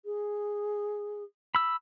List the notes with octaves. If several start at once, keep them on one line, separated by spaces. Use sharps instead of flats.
G#4
B5 E6